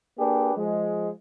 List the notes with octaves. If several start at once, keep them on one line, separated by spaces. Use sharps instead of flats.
A#3 D4 G4 G#4 B4
F3 G#3